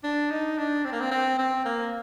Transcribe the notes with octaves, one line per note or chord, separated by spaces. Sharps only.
D4
D#4
D4
C4
A#3
C4
C4
C4
A#3